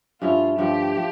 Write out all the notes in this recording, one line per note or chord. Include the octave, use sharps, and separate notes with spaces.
G2 F3 C#4 E4 F4
G2 F3 A3 G4
F3